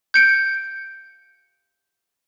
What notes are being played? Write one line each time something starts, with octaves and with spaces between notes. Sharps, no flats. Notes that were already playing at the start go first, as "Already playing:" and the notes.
G6 C#7 D7